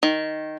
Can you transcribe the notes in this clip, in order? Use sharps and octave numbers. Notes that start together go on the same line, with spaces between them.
D#3